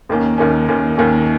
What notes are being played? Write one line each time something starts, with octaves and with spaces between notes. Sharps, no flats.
D#2 D#3 A#3 C#4
D#2 D#3 A#3 C#4
D#2 D#3 A#3 C#4
D#2 D#3 A#3 C#4